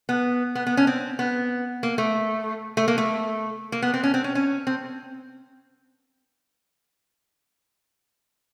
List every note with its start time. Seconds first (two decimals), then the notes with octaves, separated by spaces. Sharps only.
0.09 B3
0.55 B3
0.67 B3
0.77 C#4
0.87 C4
1.19 B3
1.83 A#3
1.98 A3
2.77 A3
2.88 A#3
2.98 A3
3.72 A#3
3.82 B3
3.94 C4
4.03 C#4
4.14 C4
4.24 C#4
4.35 C#4
4.67 C4